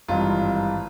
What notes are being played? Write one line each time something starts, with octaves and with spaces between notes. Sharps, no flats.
G#1 G2 E3 F4